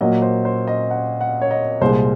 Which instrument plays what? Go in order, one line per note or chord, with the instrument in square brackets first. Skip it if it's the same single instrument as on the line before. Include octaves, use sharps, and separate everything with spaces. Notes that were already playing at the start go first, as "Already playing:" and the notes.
[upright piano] A#2 F#3 A#3 [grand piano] D#5
[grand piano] C5
C5
D#5
F#5
F#5
C#5
D#5
[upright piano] C2 A#2 G#3 [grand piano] C5